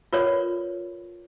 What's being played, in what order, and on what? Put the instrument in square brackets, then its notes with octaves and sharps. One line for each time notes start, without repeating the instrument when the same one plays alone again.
[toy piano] F4 A#4 B4 C#5 D5